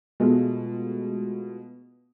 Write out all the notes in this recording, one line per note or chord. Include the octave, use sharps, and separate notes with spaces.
B2 G#3 A3 F4